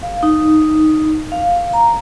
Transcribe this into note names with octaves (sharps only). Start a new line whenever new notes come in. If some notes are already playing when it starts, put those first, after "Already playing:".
F5
D#4
F5
A#5